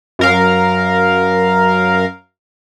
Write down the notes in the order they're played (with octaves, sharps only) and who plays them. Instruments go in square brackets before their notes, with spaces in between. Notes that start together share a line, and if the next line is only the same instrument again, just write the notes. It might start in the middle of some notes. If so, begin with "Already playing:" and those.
[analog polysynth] F#2 A#4 F5